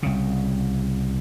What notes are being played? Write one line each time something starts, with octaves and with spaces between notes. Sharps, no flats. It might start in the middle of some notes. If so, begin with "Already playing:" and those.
C2 C#3